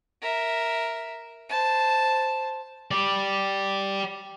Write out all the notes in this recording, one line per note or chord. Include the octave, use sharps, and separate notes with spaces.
A#4 E5
C5 A5
G4 D5